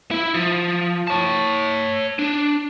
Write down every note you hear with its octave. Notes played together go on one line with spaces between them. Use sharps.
E4
F3
C#5 A5
D4